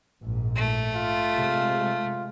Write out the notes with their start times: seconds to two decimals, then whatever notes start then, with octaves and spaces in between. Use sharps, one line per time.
0.20 A#1 G#2
0.56 A3
0.96 F4
1.36 C3 G#3